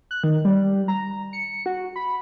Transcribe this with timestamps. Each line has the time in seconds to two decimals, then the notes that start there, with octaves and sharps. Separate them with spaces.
0.11 F#6
0.24 D#3
0.45 G3
0.88 A#5
1.33 C#7
1.66 F#4
1.96 B5